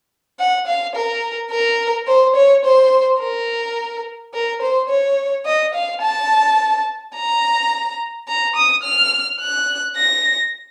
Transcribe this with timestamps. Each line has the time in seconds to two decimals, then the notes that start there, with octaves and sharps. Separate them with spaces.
0.39 F#5
0.67 F5
0.95 A#4
1.51 A#4
2.07 C5
2.36 C#5
2.65 C5
3.20 A#4
4.34 A#4
4.62 C5
4.89 C#5
5.46 D#5
5.74 F5
6.02 A5
7.15 A#5
8.28 A#5
8.56 D#6
8.83 F6
9.40 F#6
9.96 A#6